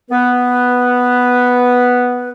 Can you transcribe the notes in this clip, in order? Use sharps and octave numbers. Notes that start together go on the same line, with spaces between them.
B3 B4